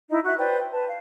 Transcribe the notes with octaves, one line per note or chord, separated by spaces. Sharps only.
D#4 E4 D#5
F#4 E5 F#6
B4 C5 D5 G5
G5
B4 A5
F5